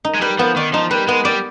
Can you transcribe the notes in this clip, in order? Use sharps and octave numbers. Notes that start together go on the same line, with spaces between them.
D#4
G#3
G3 B4
F3 B3
D#3 D5
F3 D#4
G3 B4
G#3 B3
G3 D5